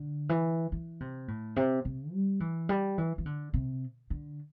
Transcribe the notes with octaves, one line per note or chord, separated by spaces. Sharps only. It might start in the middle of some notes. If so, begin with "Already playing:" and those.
Already playing: D3
E3
E3
C3
A2
C3
C3
G3
E3
G3
E3
E3
D3
C3
D3